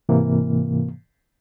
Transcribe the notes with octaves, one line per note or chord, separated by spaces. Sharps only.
G#2 C3 E3 A#3